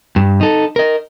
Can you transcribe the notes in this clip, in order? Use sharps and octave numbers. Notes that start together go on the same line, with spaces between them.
G2
D#4 A4
A#4 D#5